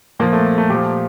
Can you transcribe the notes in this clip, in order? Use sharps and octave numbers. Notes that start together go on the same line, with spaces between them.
A#2 F3 A#3
A3
A3
A#2 F3 G4